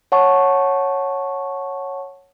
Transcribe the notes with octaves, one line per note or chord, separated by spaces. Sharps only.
C#5 F#5 A5 C#6